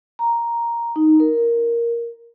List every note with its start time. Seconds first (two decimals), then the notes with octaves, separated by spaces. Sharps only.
0.19 A#5
0.96 D#4
1.20 A#4